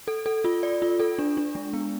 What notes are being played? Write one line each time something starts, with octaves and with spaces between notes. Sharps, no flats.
A4
A4
F4
D5
F4
A4
D4
D4
G#3
B3